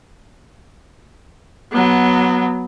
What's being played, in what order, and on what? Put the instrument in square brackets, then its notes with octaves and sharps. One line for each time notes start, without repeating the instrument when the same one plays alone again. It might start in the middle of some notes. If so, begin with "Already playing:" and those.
[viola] F#3 B3